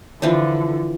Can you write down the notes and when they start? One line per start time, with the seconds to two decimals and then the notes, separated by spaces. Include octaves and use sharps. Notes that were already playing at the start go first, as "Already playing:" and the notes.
0.22 D3 E3 F3 D4